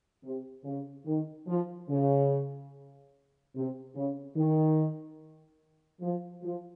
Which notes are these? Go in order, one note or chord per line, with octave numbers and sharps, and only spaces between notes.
C3
C#3
D#3
F3
C#3
C3
C#3
D#3
F3
F3